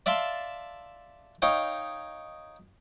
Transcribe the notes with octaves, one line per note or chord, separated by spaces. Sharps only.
D5 E5 F5 A5 C6
D#4 C#5 F5 G5